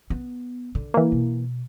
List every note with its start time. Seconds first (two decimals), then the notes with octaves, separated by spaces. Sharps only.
0.10 B3
0.75 D3
0.94 E3 A#3
1.12 B2